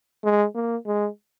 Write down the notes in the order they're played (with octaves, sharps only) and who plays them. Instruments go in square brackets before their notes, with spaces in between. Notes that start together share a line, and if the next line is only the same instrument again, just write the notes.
[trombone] G#3
A#3
G#3